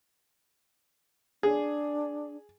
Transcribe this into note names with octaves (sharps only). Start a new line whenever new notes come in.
D4 G#4